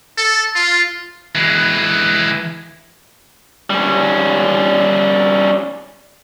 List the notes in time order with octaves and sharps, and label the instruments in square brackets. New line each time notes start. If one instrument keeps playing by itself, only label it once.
[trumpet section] A4
F4
[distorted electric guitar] E3 G#3
[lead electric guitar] G3 C#4